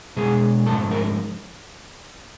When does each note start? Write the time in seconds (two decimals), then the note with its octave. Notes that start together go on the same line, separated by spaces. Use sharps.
0.17 B2 G#3 G#4
0.66 G#2 F3 A3 A4
0.91 A#4